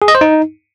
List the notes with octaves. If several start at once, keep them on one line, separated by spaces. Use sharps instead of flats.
G#4
D#5
C5
D#4